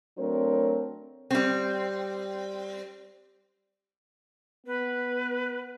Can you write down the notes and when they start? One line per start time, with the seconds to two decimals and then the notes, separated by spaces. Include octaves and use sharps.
0.18 F#3 A3 C4 D4 A#4 C#5
1.31 G3 C4
4.66 B3 B4